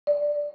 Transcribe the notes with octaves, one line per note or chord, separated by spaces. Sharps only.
D5